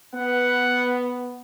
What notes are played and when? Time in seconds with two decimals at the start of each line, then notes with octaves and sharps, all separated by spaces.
0.15 B3 F#5